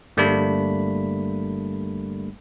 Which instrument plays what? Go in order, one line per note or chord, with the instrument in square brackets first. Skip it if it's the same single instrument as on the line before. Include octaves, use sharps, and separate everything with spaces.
[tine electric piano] G1 G3 A3 A#3 D4 B5